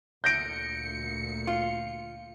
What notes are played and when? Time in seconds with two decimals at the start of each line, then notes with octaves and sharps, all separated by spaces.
0.24 D2 A#2 G6 A#6 C#7 D7
1.47 F4